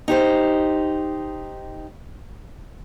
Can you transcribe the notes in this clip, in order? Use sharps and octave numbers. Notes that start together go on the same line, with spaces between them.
D#4 G4 C5